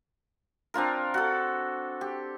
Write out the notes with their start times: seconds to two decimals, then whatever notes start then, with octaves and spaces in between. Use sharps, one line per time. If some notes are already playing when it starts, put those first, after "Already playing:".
0.74 C4 D4 F4 A#4
1.14 F#4 A4
2.01 G4